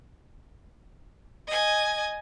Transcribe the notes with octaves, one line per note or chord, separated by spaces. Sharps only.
D#5 G#5